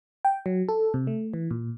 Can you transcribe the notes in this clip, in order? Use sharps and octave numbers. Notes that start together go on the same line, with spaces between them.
G5
F#3
A4
C3
A3
E3
A#2